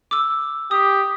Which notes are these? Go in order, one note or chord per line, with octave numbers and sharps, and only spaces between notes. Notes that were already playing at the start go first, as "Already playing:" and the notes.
D6 E6
G4 D#6